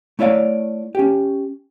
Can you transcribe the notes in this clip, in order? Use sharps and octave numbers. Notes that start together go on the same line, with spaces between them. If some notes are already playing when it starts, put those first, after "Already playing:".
A3 E4 C#5 D5 F5
C#4 G4